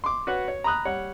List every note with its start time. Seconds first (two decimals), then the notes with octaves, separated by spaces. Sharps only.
0.04 C6 D6
0.27 F#4 B4 C#5 F#5
0.48 C#5
0.64 A#5 B5 D#6 F#6
0.85 G3 C#5 F#5